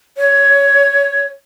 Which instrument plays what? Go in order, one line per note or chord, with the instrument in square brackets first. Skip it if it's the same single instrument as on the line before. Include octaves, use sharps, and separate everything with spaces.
[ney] C#5